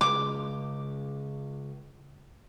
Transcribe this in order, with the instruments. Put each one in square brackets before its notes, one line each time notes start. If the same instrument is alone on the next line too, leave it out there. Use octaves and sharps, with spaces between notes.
[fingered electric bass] C#3 G#3 [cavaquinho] D6